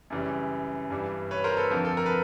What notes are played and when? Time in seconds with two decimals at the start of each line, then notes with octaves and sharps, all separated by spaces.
0.10 F#2 C#3 E3 G3
0.90 G2 E3 G3
1.31 B4 C#5
1.44 A#4 C5
1.57 A4 B4
1.70 F2 D3 F3 A#4
1.85 A4
1.97 A#4
2.06 B4